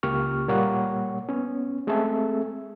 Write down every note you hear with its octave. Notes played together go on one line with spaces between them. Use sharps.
C#2 A#3 G4 C#6 F6
A#2 G3 A#3 C#5 F#5 C#6
B3 C#4
G#3 A3 C4 G#4 A4 E5